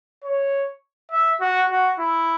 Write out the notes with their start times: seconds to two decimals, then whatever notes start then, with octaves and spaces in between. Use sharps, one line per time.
0.24 C#5
1.11 E5
1.41 F#4
1.70 F#4
1.99 E4